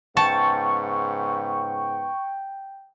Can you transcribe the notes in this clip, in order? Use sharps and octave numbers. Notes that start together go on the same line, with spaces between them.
G#2 C#3 B3 G5 A5 C#6
G5